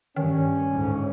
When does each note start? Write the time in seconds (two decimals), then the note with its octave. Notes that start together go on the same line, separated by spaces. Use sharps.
0.16 G2 D#3 C#4
0.73 D2 G#2